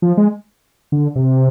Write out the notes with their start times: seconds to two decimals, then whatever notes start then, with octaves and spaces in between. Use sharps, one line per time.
0.02 F3
0.17 G#3
0.92 D3
1.16 C3